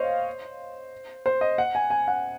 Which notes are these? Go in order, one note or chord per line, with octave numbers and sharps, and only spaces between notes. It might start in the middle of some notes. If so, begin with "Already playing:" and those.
Already playing: C5 C#5 D#5 F5
C5
D#5
F#5
G#5
G#5
F#5